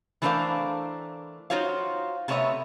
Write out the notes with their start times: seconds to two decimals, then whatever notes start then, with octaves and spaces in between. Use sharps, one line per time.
0.22 E3 A3 D4 A#4 C5 F5
1.50 D#4 F4 F#4 C5 C#5 F5
2.28 C3 A3 B3 C#5 D#5 E5